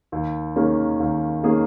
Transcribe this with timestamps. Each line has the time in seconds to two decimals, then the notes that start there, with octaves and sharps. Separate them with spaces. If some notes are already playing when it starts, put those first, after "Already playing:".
0.12 D#2
0.56 D#3 A#3 C#4 G#4
1.00 D#2
1.44 D#3 A#3 C#4 G#4